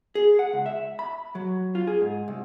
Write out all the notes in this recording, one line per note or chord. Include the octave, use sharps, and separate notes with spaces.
G#4
F#5
C#2
E5
B5
F#3
F4
G#4
G#2
C2